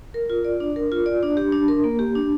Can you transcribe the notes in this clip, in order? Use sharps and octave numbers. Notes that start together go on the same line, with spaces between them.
A#4
F4
D5
D4
A#4
F4
D5
D4
G4
D4
A#4
A#3
G4
D4